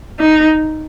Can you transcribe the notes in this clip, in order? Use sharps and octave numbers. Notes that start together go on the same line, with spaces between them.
D#4